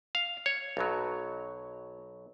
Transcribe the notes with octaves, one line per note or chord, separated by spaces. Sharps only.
F5
C#5
B1 B2 F#3